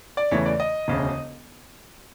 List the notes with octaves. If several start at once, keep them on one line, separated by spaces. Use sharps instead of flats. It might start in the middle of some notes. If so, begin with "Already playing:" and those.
D5
E2 C#3 E3 A3 C#5
D5
D#5
E1 D2 C#3